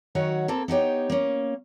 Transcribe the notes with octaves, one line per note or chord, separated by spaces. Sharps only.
D#3 F#3 F#4 C#5 F#5
A#3 C4 A4
B3 D#4 G4 C#5
A#3 C#4